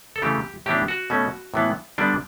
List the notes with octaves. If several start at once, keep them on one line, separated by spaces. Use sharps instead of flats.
A4
C#3 E3 A3 G4
A2 E3 B3 D4 G4
F#4
B2 A3 C#4
A2 E3 B3
D3 G3 B3 D4